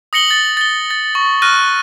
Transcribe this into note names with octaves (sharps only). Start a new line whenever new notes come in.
D#6 A#6 C#7 F#7 G7
A6
A6 G7
A6
C#6
C#6 F6 F#6 A#6 D#7